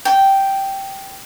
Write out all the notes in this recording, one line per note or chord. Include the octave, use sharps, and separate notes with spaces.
G5